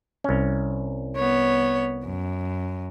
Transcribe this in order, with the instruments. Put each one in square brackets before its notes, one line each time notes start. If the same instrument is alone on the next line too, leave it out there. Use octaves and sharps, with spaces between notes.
[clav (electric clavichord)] C2 C#4
[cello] B3 C#5
F#2